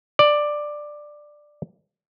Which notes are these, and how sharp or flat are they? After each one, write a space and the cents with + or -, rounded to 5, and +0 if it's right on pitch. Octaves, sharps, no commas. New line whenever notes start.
D5 +10